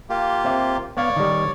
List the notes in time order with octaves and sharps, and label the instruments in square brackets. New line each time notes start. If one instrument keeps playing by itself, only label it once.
[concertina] A#3 F4 G4
[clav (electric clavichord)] C4 E5
[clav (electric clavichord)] B3 F5 [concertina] C#5 D5
[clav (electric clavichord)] D#3 G3